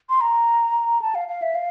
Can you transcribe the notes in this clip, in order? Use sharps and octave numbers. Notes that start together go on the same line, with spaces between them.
C6
A#5
A5
F5
F5
E5
F5